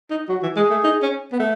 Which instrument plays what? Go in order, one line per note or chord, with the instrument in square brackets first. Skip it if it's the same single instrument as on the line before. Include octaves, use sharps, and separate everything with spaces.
[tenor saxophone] D#4
[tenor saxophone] F#3 [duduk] F#4
[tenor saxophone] E3
[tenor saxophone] G#3 [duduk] G#4
[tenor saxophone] A3
D#4
C#4
B3
A3